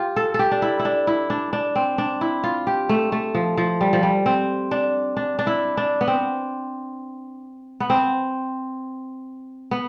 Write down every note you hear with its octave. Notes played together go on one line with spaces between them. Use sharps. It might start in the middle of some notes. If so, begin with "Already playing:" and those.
Already playing: F4 G4
A4
A4
G4
D4
E4
E4
D4
E4
D4
D4
C4
D4
E4
F4
G4
A3
A3
F3
F3
G3
F3
G3
C4
D4
D4
D4
E4
D4
B3
C4
B3
C4
B3